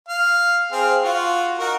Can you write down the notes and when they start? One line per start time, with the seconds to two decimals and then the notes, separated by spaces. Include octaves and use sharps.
0.09 F5
0.72 C4 G#4 F5
1.03 F4 F#4
1.59 D#4 F#4 A#4